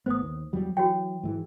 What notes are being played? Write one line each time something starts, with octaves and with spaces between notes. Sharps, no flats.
G#1 A3 B3 C5 D#6
D#2
E2 F#3 G3
E3 F#3 F#4 C#5 G5
G#2 E3 G#3